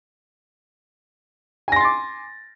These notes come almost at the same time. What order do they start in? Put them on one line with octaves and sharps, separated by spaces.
G#5 A#6 C6 A6 D6